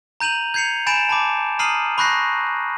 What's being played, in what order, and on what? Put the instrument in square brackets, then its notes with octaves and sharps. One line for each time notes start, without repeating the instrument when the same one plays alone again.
[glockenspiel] A#5 G6 D#7 F7 F#7
G6 G#6 C7 C#7 F7
G#5 B5 G6 A6 D7 E7
A5 B5 D6
A#5 D#6 F6 C7 D#7 F#7
B5 C#6 F#6 G6 A#6 C7